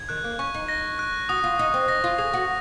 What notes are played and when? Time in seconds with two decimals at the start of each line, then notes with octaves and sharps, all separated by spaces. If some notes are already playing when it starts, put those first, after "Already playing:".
Already playing: G#6
0.09 D#3 F#6
0.24 A#3
0.39 C#4 C#6
0.54 D#4
0.68 A#6
0.99 F#6
1.29 F#4 D#6
1.44 F4
1.59 D#4 D#6
1.74 C4
1.88 D#4 A#6
2.04 F4
2.18 G#4 D#6
2.34 F#4